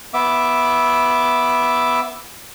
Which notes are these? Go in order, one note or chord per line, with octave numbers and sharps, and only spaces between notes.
B3 E5 D6